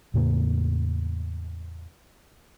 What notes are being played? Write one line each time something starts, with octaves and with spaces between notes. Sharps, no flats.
E2 A2 C#3 A#3